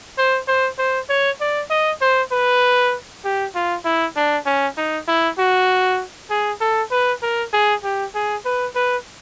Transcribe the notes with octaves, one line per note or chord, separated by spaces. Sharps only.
C5
C5
C5
C#5
D5
D#5
C5
B4
G4
F4
E4
D4
C#4
D#4
E4
F#4
G#4
A4
B4
A#4
G#4
G4
G#4
B4
B4